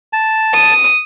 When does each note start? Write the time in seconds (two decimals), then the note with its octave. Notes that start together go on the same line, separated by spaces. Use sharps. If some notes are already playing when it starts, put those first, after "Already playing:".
0.13 A5
0.55 D#6